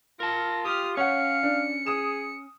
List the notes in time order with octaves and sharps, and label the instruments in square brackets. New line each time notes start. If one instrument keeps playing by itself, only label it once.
[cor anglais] F4 [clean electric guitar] A#4 A5 [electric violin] A#6
[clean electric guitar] G4 [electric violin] D#6 F6
[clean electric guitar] C#4 [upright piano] C#5 F#5 [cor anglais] F5 [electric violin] C#7
[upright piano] D4
[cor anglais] G#4 [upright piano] D#6 E7